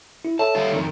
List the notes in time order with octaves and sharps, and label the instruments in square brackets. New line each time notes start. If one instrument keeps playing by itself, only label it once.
[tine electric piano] E4
[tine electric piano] A4 C#5 E5 [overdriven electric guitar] A5
[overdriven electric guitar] G3 F4
F2 D#3